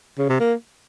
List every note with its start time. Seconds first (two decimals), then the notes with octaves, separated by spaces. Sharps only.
0.18 C#3
0.29 C3
0.40 A#3